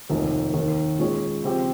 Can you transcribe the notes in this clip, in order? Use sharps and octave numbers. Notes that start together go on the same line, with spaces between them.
F1 D#2 D#3
D#2 D#3 A#3
A#2 G#3 C#4 G#4 C#5
C#3 F3 C4 G4